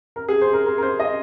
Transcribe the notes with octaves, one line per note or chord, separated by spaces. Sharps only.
A#4
G#4
C5
A#4
A#4
A#4
C5
D#5